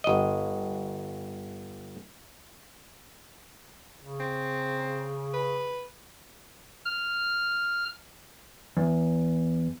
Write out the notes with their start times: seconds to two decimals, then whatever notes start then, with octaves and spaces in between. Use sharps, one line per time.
0.04 G1 D#5
4.00 C#3
4.20 C4
5.34 B4
6.85 F6
8.77 E2